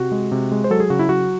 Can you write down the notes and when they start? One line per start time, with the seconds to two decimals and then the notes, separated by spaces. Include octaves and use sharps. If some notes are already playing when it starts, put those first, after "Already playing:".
Already playing: C3 F#4
0.12 G#3
0.32 C3
0.52 G#3
0.64 C5
0.70 F#3 A4
0.80 G#4
0.90 C#3 F#4
0.99 E4
1.09 F#3 F#4